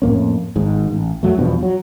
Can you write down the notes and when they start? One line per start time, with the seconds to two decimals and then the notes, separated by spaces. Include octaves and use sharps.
0.02 F2 A2 A#3 C#4
0.56 G#1 G#2
0.91 A1
1.23 F#2 F#3 A3
1.37 E2 G2 B2 F3
1.63 F#3